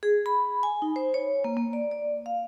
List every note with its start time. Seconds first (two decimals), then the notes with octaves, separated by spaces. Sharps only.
0.03 G#4
0.26 B5
0.63 G#5
0.82 D#4
0.96 C5
1.14 C#5
1.44 A#3
1.57 A#3
1.73 D5
1.91 D5
2.26 F5